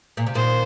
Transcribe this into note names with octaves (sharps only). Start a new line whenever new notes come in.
A#2
C3
A#2 D#3 C5